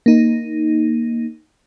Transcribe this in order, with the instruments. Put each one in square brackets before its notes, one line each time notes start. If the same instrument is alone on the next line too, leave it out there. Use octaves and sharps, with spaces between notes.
[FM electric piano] A#3 D#4